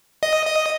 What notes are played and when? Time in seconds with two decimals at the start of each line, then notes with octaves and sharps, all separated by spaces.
0.23 D#5
0.46 D#5